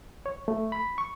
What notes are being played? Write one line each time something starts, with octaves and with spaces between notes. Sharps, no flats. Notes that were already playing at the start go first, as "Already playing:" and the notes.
C#5
A3
B5
C#6